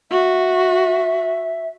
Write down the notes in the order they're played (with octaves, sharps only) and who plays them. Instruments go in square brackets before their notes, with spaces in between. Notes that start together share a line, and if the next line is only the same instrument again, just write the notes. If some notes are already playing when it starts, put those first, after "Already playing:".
[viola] F#4 [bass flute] E5